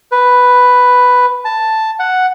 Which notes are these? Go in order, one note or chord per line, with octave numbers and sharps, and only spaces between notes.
B4
A5
F#5